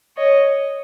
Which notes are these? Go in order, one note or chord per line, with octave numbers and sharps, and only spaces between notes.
C#5 D#5